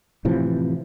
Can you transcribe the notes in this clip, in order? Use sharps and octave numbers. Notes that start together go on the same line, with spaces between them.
A2 C3 E3 F3